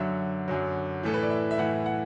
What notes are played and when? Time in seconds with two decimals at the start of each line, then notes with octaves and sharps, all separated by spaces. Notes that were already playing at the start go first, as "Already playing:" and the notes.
Already playing: F#2 D3 F#3 E5
0.48 F#2 D3 F#3
1.03 A2 E3 A4
1.14 B4
1.22 D5
1.30 E5
1.51 E5
1.58 A2 E3 F#5
1.86 F#5